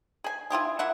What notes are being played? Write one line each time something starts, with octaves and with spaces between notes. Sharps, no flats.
G#4 G#5
E4 F4 G4 G#4
A#3 E4 E5 F#5